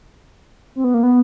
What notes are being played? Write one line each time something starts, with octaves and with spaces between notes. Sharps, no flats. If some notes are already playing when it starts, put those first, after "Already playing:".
C4
B3
A#3
B3